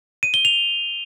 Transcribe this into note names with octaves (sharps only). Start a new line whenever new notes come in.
D#7
G7
F7